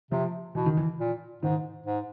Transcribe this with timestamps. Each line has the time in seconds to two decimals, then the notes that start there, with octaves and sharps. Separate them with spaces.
0.11 C3 F3
0.55 B2 E3
0.66 D#3
0.77 E3
0.99 A#2
1.43 G#2 D#3
1.86 G#2